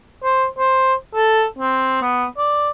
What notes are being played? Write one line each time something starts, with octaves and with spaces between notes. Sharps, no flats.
C5
C5
A4
C4
B3
D5